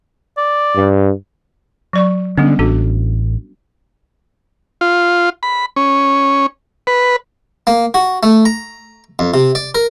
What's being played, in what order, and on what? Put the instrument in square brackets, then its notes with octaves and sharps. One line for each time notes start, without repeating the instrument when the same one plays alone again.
[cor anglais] D5
[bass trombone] G2
[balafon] F#3 D5 C#6
[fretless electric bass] D3 [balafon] G3 B3 C#4
[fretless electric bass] A1 [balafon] D4 F#4 A4
[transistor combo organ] F4
B5
C#4
B4
[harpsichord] A#3
F#4
A3
A#5
F2
C3
D5
A#4